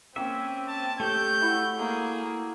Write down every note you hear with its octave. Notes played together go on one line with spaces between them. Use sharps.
A#3 C4 C#4 E5 G5
A5
A3 G4 A4 C#5 G6
E4 F#4 C#5
A#3 G#4